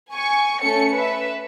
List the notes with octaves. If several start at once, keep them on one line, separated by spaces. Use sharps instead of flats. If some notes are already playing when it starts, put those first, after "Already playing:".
G#5 C#6
A3 C#4 A4 C#7
B4 E5